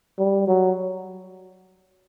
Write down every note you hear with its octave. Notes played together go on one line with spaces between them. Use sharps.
G3
F#3